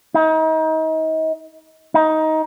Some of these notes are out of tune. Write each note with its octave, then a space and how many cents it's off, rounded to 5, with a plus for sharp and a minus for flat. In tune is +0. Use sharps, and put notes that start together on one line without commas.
D#4 +35
D#4 +15